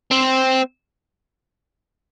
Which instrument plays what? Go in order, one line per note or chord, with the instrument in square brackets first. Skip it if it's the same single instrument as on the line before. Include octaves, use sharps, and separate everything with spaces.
[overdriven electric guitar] C4